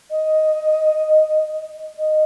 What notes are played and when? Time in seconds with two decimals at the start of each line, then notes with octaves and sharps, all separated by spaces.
0.11 D#5
1.98 D#5